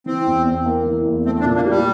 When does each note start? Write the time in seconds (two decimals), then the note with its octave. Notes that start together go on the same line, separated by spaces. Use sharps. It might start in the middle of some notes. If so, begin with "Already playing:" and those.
0.06 E3 C4
0.26 E2
0.46 E2
0.65 A#3
0.86 E3
1.05 E2
1.25 A3 C4
1.40 D4
1.45 A#2
1.56 A#3
1.65 G4
1.70 G3